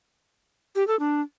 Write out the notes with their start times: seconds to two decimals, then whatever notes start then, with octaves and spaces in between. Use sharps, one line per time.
0.75 G4
0.87 A4
0.99 D4